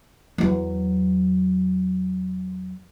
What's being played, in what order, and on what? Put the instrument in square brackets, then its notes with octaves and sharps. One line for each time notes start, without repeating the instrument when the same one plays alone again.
[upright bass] E2 F#3